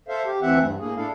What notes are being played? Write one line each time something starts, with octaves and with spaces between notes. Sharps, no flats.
A4 C5 E5 F5
G4
D2 E3 C4 E5 F#5
G2
A2 A#3 G#4
D4 E4 A4 F5